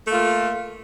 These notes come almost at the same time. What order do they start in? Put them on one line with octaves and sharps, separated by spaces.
A3 A#3 F4